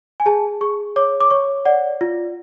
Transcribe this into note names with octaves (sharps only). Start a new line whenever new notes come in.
G#5
G#4 A5
G#4 C#6
C#5 D6
D6
C#5 C#6
D5 F#5
F4